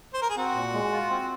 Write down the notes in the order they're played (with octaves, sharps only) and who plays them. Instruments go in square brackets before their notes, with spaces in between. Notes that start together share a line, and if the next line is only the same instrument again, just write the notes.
[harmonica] C5
A#4
G#4
[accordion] C4 [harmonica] F#4
[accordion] A#2
G#3
F4
C4